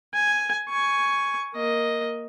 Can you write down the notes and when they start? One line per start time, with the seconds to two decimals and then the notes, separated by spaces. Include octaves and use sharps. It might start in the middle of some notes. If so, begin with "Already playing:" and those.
0.14 G#5
0.69 G#5 C#6
1.55 A#3 D#5